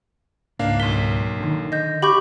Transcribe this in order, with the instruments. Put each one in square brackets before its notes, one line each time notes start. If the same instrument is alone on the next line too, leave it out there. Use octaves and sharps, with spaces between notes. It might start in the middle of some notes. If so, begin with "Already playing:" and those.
[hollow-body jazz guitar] C#2 G#2 [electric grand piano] A#3 D4 F5
[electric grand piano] B1 A#3 B6 [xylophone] G7
[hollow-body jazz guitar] D3 D#3
[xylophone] D#5 G6
[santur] G4 [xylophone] B5 C#6 G6